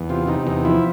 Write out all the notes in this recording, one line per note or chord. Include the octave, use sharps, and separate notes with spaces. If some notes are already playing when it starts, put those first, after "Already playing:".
Already playing: E2
C3 F4
C3 D#4
E2 D#4
F3 E4